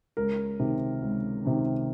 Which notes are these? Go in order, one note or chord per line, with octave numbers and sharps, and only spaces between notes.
C#2 A#4
C3 D#3
C#2
C3 D#3